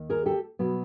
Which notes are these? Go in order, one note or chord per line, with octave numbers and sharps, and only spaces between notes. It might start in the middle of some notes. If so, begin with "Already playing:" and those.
Already playing: D#2 D#3
G#4 A#4
G4 A4
B2 F#3 B3